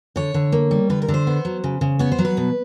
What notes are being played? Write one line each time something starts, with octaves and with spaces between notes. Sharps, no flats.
D3 C#5
D3
A#3
G3
D3 B4
A#4
D3
C5
B3
F#3
C#3
C#3
B3 C#5
C5
F#3
B4
B2